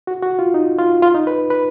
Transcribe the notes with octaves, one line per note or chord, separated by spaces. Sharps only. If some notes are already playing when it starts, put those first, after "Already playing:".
F#4
F#4
F4
D#4
F4
F4
D#4
B4
B4